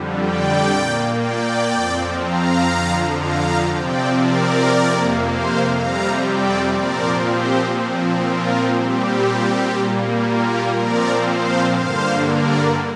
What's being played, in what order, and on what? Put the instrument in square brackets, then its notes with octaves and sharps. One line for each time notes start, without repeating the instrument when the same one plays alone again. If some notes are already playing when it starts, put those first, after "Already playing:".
Already playing: [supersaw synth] F2 D3 G3
D5 G5
A#2 A#3
D5 G5
F2 F3 C4
F5 A#5
F2 D3 F3
F5 A#5
C3 F3 C4 D5 G5
A#4 D5
F2 C3 A#3
C5 F5
F2 C3 G3 C4 F5 A#5
D5 G5
A#2 F3 C4 A#4 D5
G4 C5
A#2 F3 C4
F4 A#4
A#2 G3 C4 G4
A#2 G3 A#3
F4 A#4
A#2 F3 C4 A#4 D5
C5 F5
G2 D3 A#3 C5 F5
A#4 D5